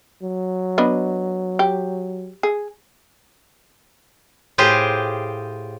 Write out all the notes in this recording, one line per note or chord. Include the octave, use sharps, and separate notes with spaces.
F#3
B3 D4 D#5
G4
G#4
A2 F4 G4 G#4 C5